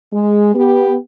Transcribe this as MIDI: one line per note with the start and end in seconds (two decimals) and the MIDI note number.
0.13 0.51 56
0.55 0.96 59
0.55 0.96 67